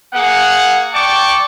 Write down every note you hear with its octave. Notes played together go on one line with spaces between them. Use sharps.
A#3 G#4 F#5
D5 G5 A5 C#6 D6